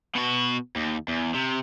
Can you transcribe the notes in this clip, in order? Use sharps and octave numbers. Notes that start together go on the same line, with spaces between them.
B2 F#4
D#2
E2
C3